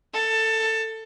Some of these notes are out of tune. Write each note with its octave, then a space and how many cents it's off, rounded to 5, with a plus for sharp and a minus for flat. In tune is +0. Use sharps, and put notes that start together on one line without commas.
A4 +15